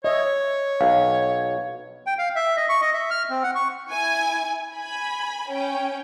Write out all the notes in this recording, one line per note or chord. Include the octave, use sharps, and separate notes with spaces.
C#5 D#5 E5
B1 F5
G5
F5
E5
D#5
C#6
D#5
E5
F6
C4
F#5
C#6
E4 G#5
G#5 B5
C#4 G5